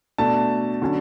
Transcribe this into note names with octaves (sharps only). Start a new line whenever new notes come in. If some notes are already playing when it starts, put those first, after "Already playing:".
B2 A3 D4 A5
D3 F#3 C#4